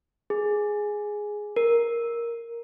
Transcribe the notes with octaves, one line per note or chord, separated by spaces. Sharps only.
G#4
A#4